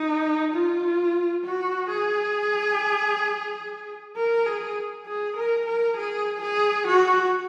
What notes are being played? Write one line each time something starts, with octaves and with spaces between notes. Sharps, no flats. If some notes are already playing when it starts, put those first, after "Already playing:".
Already playing: D#4
F4
F#4
G#4
A#4
G#4
G#4
A#4
A#4
G#4
G#4
F#4